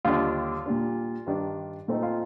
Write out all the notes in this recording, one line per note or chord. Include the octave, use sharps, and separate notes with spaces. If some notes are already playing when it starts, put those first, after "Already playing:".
D#2 D3 G3 D4 F4
A#2 G3 D4
G2 D#3 G3 D4
A#2 A3 C4 D#4
F4